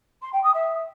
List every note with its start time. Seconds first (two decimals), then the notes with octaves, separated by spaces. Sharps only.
0.22 C6
0.33 G5
0.43 D#6
0.54 E5